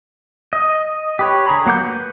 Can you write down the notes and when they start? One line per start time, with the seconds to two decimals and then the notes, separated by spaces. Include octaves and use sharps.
0.53 D#5
1.19 G4 B4 C#5
1.46 D3 G#4 A#5 B5
1.66 F#3 A#3 F#5 D6 G6
1.84 B4